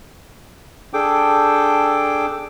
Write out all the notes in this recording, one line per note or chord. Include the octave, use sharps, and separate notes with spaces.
D4 G#4 A4 G5 D6